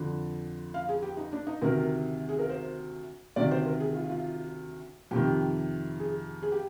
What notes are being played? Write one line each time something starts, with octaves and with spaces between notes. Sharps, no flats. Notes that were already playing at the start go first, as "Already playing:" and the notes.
Already playing: F2 D3
F5
G#4
G4
D#4
D4
D#4
D2 C3 D#3 A#4
G#4
A#4
C5
D2 C3 D#3 D5
C5
A#4
G#4
F4
F4
F2 C3 D#3 G4
G#4
G#4
G4